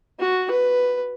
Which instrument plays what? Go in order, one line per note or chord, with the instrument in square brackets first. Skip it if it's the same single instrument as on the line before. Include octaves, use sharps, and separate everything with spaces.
[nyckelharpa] F#4
B4